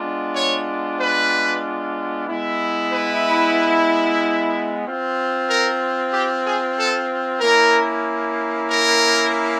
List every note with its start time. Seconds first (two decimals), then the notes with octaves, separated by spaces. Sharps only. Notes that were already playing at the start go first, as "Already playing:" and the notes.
Already playing: G#3 B3 D4 F4
0.35 C#5
1.00 B4
2.28 G#3 B3 E4
2.93 B4
4.85 C4 F4
5.49 A#4
6.13 G4
6.45 G#4
6.76 A4
7.41 A#3 C#4 E4 A#4
8.69 A#4